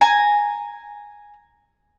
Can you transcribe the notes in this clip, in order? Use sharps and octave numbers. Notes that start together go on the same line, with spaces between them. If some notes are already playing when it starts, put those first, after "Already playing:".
G#5 A#5